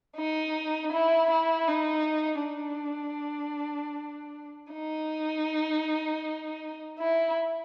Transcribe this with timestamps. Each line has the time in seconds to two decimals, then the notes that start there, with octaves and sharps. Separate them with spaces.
0.17 D#4
0.93 E4
1.31 E4
1.68 D#4
2.43 D4
4.72 D#4
6.99 E4